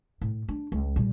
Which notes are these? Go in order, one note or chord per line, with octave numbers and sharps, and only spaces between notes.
A2
D4
C#2
A#2 G3